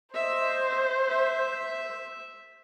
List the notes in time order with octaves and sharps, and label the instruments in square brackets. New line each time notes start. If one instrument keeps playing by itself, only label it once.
[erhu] C5 [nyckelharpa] D#5 E5
[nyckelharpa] E5